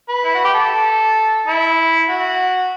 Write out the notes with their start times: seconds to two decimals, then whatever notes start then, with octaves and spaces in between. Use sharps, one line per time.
0.09 B4
0.24 E4
0.35 F#4
0.44 G4
0.54 A4
1.47 E4
2.09 F#4